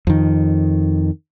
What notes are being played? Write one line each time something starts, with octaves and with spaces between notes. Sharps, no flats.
F2 D#3